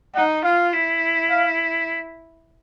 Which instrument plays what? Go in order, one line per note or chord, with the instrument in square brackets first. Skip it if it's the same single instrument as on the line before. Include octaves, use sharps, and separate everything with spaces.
[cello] D#4 [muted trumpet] F#5
[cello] F4 [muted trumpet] F5
[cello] E4
[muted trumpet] F5